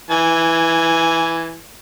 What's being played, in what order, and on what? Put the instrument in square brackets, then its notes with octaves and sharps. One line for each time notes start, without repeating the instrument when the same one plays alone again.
[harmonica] E3 G#5